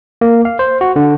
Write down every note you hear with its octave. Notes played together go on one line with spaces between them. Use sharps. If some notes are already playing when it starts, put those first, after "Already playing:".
A#3
F5
C5
F#4
D3